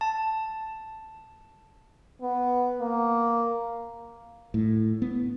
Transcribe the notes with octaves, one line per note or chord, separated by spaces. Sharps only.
A5
B3
A#3
A2
B3